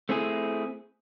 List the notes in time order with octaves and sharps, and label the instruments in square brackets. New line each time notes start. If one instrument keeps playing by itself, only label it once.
[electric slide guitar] A3 C4 E4 G#4